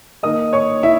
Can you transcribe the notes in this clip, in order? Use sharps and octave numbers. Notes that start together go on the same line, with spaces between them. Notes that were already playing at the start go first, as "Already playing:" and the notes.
D#3 A#3 D#4 D#5 D#6
C#5 C#6
E4 E5